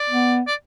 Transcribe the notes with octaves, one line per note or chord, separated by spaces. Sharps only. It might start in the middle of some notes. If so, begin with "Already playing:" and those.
Already playing: D5
B3
D5